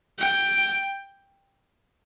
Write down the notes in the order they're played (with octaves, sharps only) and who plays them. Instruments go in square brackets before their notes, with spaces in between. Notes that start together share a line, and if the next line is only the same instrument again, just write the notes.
[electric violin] G5